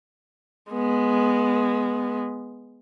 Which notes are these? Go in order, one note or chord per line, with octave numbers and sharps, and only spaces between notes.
G#3 B3